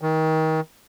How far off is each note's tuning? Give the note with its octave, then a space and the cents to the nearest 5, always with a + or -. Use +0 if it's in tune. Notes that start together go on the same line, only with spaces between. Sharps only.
D#3 +30